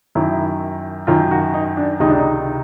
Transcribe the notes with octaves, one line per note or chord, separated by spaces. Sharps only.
F#2 D#3 E4
F#2 D#3 F4
F#4
D#4
D4
C#2 C3 D#3 D#4
D4
D#4